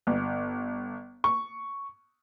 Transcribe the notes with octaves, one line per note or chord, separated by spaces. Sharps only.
G1
C#6